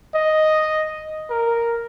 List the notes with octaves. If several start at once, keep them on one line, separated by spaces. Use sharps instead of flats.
D#5
A#4